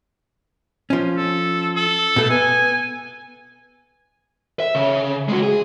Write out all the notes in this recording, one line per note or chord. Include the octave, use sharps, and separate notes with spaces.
F3 C#4
A4
A4
B2 A3
B3 G#5
E5
C#3
G#3 F#4
G#4